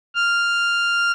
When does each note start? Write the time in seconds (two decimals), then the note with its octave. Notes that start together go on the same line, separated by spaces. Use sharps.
0.15 F6